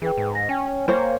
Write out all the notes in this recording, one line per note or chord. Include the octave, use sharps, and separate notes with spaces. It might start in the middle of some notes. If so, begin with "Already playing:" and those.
E3 G#4 B4 G5
G#2
A#6
C#4 G5 G#5
A#3 C5 C#5